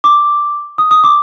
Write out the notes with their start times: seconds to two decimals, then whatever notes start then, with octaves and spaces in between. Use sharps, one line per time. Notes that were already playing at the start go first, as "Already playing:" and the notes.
0.04 D6
0.78 D#6
0.91 D#6
1.04 D6